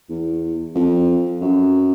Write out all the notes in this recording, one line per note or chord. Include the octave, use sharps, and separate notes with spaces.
E2
F2
F#2